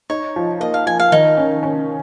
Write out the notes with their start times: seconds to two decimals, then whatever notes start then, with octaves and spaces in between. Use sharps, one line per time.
0.10 D#4 C#5
0.36 F3
0.60 A#3 D#5
0.74 F5
0.86 F3 G#5
1.00 F5
1.12 D#3 D#4
1.37 C#4
1.63 C#4